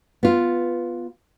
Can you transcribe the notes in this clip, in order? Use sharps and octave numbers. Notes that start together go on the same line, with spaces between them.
B3 F4